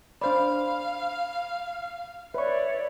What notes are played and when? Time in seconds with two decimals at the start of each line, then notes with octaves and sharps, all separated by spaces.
0.22 D4 C5 D5 F5 B5
2.34 B4 C#5 D5 E5 C#6